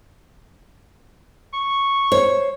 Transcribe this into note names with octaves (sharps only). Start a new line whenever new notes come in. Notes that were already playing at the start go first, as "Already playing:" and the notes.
C#6
C5 C#5